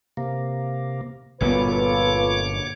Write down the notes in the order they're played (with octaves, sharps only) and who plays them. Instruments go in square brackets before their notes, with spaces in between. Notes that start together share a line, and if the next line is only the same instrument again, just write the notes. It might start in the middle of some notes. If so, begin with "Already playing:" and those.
[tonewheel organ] C3 A#3
[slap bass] G1 A#2 B3 [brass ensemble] F4 A4 B4 [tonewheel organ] C#5 D6